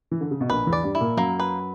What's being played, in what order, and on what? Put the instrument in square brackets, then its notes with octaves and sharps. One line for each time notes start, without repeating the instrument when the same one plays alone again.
[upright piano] E3
D3
C#3
B2
[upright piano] A#1 A#2 [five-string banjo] B4
[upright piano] E2 E3
[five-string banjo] D5
[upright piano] G2 G3
[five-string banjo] E4
[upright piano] A#2 A#3
[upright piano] F#2 F#3 [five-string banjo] A#3
[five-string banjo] B4